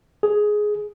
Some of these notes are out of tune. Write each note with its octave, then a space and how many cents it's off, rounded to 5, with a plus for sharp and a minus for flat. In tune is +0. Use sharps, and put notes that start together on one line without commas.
G#4 +10